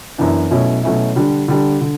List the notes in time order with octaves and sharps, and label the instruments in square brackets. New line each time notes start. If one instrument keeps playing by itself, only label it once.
[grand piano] F#2 E3 B3 D4
B2 F#3 A3 C#4 E4
B2 F#3 A3 C#4 E4
D3 G3 D4
D3 G3 D4
D3